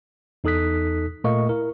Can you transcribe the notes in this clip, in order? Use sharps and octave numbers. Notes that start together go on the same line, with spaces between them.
E2 D#4 A4 D#6 F#6 B6
A#2 A3 A#4 D#5 F5 C#6
E4 A#4